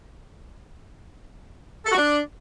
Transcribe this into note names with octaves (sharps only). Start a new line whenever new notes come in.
A4
F#4
D4